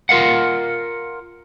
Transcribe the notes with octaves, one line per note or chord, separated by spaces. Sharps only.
F4 A#4 F5 F#5